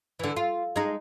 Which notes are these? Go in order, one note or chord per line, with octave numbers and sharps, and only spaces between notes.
D3 E3
F4
G#3 D#4